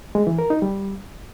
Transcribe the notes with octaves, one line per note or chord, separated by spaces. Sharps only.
G#3
E3
A#4
D#4
G3